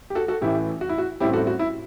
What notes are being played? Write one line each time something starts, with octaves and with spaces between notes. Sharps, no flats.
G4
F#4 A4
F#4 A4
A1 A2 E3 E4 G4
F#4
E4
F#4
A1 A2 G3 C4 E4 G4
F#4 A4
F#4
E4